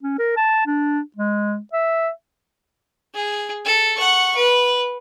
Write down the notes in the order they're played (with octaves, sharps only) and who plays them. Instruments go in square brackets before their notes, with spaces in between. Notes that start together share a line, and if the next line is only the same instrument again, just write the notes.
[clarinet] C#4
A#4
A5
D4
G#3
E5
[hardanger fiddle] G#4
A4
F#5 C#6
B4